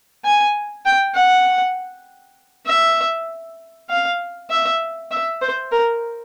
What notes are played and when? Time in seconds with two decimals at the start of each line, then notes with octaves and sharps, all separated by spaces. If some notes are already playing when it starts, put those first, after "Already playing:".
0.25 G#5
0.85 G5
1.15 F#5
2.67 E5
3.89 F5
4.50 E5
5.11 E5
5.42 C5
5.72 A#4